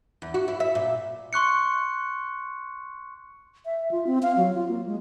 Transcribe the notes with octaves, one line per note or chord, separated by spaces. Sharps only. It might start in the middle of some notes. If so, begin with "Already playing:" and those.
E2
F#4
E4
E5
A#2
C6 C#6 F#6 C#7
E5
F4
C4
F5
F#3
F4
A#3
G#3